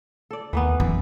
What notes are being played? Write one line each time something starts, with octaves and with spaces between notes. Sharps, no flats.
A4 D5
D#2 E3 A#3 B3
F#2 E3 E4